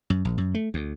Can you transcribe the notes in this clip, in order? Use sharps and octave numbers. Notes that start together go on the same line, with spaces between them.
F#2
A#1
F#2
A3
D2